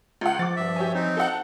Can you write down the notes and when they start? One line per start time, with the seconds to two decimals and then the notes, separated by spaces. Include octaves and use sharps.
0.21 C#2 F#5
0.39 F3 D6 A6
0.56 G2 E5
0.76 G4 C#5 G#5
0.94 C4 D#4
1.17 A4 F5 F#5